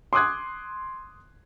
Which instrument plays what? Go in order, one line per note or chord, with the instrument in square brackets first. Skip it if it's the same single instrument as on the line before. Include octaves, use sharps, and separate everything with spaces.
[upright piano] C6 D6 D#6 F#6 G#6